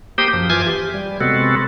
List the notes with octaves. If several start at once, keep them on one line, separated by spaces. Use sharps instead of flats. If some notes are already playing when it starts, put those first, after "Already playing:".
A#3 G4 C5 G5 D#6
F#2 F3
E3 F4 G#5 C6 D6 G#6
G4
G3
C3 G#3 B3 C4 F#4 A4